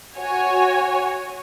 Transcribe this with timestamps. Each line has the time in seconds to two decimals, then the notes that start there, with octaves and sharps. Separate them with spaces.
0.17 F#4 C#5 G#5